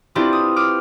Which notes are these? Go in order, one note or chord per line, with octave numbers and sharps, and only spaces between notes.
C4 D4 E4 F4 G4 B4
D#6
D6 F6 D#7